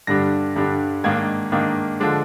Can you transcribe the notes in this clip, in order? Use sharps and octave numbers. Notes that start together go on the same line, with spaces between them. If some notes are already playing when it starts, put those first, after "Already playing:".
G2 D3 G3 D4 A#6
G2 D3 G3 D4
G#2 D#3 A#3 D4 G#6
G#2 D#3 A#3 D4
D3 F3 G#3 D4